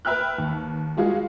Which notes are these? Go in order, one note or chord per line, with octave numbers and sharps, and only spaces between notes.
B4 E5 G5 F6 F#6
D#2
G3 G#3 F4 F#4 G#4